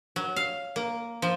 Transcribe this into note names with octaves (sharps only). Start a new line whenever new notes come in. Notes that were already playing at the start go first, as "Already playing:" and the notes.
F#3
F5
A#3
F3